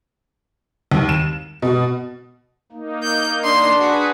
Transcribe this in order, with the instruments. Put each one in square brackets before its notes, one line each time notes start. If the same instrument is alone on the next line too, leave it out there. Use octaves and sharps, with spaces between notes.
[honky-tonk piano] D#2
E7
B2
[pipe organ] A#3 D#4
[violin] G6
[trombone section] D4 [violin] C6
[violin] F#4 [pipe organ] G#4 B4